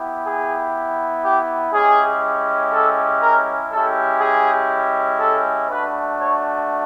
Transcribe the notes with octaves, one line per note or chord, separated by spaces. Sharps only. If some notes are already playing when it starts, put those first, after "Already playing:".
Already playing: B3 E4 G4
G#4
G4
G#3 C#4 E4 G4 G#4
A4
A#4
G#3 C#4 E4 G4 A4
G#4
A4
A3 D4 F#4 B4
C#5